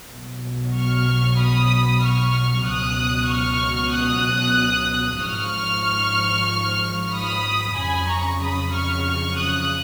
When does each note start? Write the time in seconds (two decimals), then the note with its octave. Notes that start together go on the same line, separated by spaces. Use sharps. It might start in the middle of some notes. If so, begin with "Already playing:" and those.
0.11 B1 B2 F#3
0.75 C#6 F6
1.39 B5 D#6
2.02 C#6 F6
2.66 C#2 B2 F#3 D#6 F#6
3.31 C#6 F6
3.94 D#6 F#6
5.22 G#1 G#2 F3 C#6 F6
7.14 B5 D#6
7.78 F2 C#3 F#3 G#5 B5
8.09 A#5 C#6
8.42 B5 D#6
8.73 C#6 F6
9.06 C#6 F6
9.38 D#6 F#6